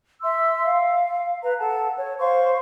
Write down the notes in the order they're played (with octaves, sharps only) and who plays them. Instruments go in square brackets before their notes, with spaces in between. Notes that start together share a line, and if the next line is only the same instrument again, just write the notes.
[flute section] E5 C6 E6
F5
B4 A#5
A4 F#5 A5
C#5
C5 F5 C6 C#6